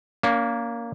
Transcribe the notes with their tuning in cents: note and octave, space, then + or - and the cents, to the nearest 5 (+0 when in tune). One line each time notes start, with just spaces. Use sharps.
A#3 +0 C#4 +40